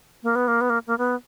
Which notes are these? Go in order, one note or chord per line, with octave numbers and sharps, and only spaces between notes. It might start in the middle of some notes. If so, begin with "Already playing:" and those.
A#3
B3
A#3
B3
A#3
A#3
B3